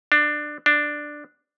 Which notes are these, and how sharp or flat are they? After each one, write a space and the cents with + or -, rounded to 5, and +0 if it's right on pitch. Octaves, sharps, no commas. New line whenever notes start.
D4 +15
D4 +5